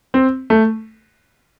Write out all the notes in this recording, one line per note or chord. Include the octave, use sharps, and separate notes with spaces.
C4
A3